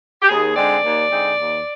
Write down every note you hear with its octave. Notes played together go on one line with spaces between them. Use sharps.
G4
D#2 G#4
D3 G#3 C4 D#4 D5
D#2
D3 G#3 C4 D#4
D#2